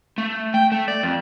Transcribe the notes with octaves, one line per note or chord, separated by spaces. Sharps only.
A3
G5
A3
D5
F2